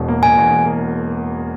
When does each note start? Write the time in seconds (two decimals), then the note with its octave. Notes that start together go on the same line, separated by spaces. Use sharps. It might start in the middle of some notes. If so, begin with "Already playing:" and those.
Already playing: E1 E2 B2
0.08 A#3
0.22 B2 G#5
0.37 E2
0.50 E1
0.65 A#3